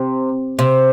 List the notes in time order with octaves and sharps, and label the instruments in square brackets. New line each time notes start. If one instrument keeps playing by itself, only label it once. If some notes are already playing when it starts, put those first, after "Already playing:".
Already playing: [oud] C3
C3